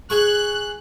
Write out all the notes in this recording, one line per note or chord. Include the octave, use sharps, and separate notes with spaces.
G#4 C#6 F#6